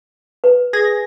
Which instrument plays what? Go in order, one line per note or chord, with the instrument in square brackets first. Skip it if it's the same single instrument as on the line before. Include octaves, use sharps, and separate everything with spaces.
[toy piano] B4
[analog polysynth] G#4 G#6 A#6